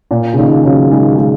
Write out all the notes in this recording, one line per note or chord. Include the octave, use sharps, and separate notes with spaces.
A#2
C#3
A#2 D#3
C#3 F#3
D#3 G#3
D#3 G#3